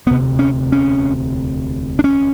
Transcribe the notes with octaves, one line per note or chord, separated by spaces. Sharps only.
E1 D2 C3 B3
C#4
C#4
D4
C#4